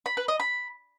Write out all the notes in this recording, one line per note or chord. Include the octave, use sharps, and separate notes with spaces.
B5
B4
D#5
B5